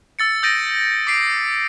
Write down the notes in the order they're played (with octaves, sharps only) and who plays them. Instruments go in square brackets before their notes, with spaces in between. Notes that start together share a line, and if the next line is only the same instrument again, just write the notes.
[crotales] E6 A6 C#7
D#6 G6 A6 A#6 D7 D#7
D6 B6 C7 D7